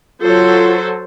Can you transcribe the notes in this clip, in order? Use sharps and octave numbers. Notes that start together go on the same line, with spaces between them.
F#3 F4 A4 C5